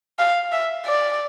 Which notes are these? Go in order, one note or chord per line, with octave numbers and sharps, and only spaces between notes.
F5
E5
D5